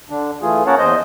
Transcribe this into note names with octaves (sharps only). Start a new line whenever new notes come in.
D3 D4
E3 A3 F4 G#4
A#3 C#4 A#4 C#5 F#5 A5
E2 C5 D#5 G6